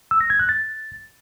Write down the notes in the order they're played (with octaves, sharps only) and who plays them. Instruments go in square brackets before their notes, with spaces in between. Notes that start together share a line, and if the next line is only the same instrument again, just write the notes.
[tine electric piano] E6
A#6
G#6
F#6
A6